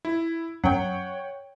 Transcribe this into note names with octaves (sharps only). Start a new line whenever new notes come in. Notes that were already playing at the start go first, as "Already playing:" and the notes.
E4
F#2 C#5 F#5 G5